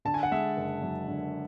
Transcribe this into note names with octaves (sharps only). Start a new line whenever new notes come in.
D3 A5
G#5
F#5
G#3 E5 G#5
F#1
F#2
D3